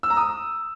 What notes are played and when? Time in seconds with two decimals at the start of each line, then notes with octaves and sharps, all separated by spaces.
0.03 E6
0.10 A#5
0.17 D#6